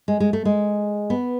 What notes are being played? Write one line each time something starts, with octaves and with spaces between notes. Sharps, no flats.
G#3
G#3
A3
G#3
B3